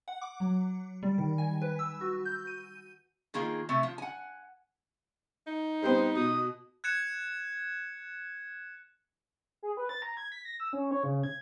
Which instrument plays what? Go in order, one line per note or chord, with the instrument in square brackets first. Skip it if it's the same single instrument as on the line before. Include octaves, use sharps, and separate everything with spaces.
[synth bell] F#5
D6
F#3
G3
D#3
G#5
B4
E6
F#4
G6
D#7
[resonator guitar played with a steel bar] D#3 A#3 F4 G#4
C3 A3 E5
F3
F#5 G#5
[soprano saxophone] D#4
[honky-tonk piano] G3 B3 C4 [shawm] C5
[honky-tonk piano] B2 [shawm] D#6
[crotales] F#6 G#6 C#7 E7
[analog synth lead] G#4
B4
A6
A#5
G#6
B6
A#6
E6
C#4
C#5
C#3
G#6